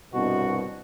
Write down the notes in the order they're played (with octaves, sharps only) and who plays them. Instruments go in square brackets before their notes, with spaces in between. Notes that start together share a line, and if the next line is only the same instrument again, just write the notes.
[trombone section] C2 G2 B2 [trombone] F#4